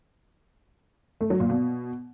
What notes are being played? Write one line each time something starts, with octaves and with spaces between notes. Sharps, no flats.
A3
F#3
A#2
B2